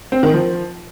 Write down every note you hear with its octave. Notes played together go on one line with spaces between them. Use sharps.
C4
D#3
F3